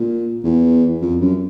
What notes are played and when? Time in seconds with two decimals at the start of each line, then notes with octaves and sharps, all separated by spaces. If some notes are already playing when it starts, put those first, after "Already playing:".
Already playing: A#2
0.44 E2
1.02 F2
1.21 F#2